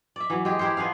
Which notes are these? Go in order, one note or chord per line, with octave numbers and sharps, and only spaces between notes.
D5 E5
E3 F#3
G#3 G4 G#4
E4 G4 A#4 C5
F3 B3 G#4 F5